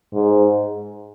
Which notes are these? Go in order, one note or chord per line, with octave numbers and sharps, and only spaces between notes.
G#2